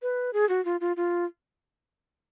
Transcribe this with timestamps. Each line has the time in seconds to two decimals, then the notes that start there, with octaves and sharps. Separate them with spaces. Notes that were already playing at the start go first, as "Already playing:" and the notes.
0.02 B4
0.33 G#4
0.49 F#4
0.65 F4
0.81 F4
0.97 F4